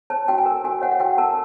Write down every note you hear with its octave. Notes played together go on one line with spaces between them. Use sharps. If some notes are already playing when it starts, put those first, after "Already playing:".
C#5 A5
F#4 G5
G#5
A#4
F#4 G#5
C#5 F#5
F#5
F#4 G5
A#4 A5